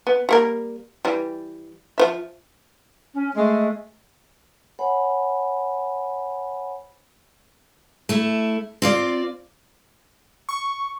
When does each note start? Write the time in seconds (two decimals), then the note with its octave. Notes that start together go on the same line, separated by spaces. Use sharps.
0.07 B3
0.29 G3 A#3 A#4
1.05 E3 G3
1.98 F3 C5 E5
3.14 C#4
3.35 G#3 A3
4.79 C5 C#5 F#5 G#5 B5
8.09 A3 E4
8.82 C4 F4 D5
10.49 C#6